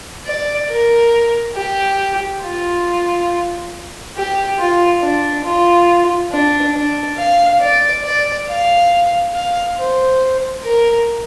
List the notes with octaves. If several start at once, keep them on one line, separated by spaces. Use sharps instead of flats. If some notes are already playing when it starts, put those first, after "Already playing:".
D5
A#4
G4
F4
G4
F4
D4
F4
D4
D4
F5
D5
D5
F5
F5
C5
A#4